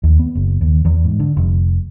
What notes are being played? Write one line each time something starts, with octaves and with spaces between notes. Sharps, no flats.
D#2
B3
F#1
D#2
E2
G#2
D3
F1